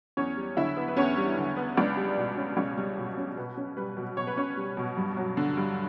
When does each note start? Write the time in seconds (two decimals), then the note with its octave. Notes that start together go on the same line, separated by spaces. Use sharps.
0.17 E2 C#4 C#5
0.37 G3
0.57 D3 E4 E5
0.77 B3
0.88 B4
0.97 E2 C#4 C#5
1.18 G3
1.37 D3
1.57 B3
1.77 C#2 D4 D5
1.97 G3
2.17 B2
2.37 C#4
2.57 C#2 C#4 C#5
2.77 G3
2.97 B2
3.18 C#4
3.37 B2 B4
3.57 C#4
3.77 G3 B4
3.97 B2
4.17 B2 C#5
4.27 B4
4.37 C#4 C#5
4.57 G3
4.77 B2
4.97 G2
5.17 F#3
5.37 D3
5.57 G2